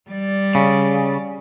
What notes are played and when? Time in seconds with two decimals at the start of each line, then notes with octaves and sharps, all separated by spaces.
0.11 G3 D5
0.55 C#3